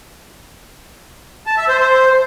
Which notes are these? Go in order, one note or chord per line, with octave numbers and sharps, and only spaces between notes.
A5
E5
C5
C5